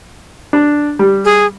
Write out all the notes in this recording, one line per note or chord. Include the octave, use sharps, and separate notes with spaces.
D4
G3
G#4